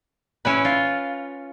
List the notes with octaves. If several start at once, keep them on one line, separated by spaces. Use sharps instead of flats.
C#4 E4 B4
F4